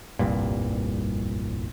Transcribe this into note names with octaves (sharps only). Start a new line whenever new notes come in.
F1 C2 G2 A#2